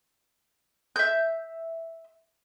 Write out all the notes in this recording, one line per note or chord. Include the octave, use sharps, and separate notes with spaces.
E5 G6